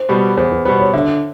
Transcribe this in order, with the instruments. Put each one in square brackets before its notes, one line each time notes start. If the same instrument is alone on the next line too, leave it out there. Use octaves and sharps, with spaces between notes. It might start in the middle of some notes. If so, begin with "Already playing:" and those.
Already playing: [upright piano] C5
[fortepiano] B2 G3 B3
[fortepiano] E2 [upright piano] C5
[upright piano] B4
[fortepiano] B2 G3 B3 [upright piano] C5
[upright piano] C#5
[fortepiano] D3 [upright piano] E5